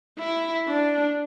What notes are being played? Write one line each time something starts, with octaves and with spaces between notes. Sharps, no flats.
E4
D4